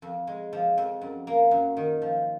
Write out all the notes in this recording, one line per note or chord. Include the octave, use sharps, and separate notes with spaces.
F2
G#3
F3
F2
F#2
A#3
F#2
D#3
F3